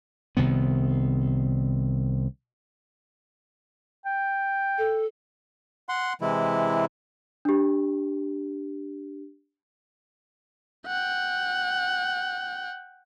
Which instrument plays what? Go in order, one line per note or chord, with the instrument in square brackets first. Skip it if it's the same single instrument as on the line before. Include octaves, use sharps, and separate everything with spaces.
[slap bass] C2 C3 D#3 B3
[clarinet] G5
[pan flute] A4
[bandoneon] F#5 C6
C3 E3 G#3 E4
[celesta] D4 G4
[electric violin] F#5 G5